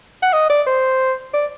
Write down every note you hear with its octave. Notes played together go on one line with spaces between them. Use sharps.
F#5
D#5
D5
C5
D5